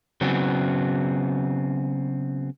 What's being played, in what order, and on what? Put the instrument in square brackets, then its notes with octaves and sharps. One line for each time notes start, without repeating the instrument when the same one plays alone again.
[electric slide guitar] C#3 F#3 B3 C4